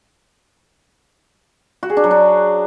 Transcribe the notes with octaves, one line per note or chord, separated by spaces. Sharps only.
F#4
G#4
D4
F#3
D4